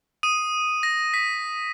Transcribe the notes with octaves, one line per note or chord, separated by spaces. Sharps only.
D#6 D#7
A#6
B6